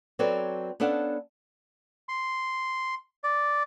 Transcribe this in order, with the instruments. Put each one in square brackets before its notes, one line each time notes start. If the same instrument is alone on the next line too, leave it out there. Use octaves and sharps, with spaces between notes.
[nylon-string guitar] F#3 C4 A4 B4 C#5 D5
B3 C#4 D4 A4 F5 F#5
[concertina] C6
D5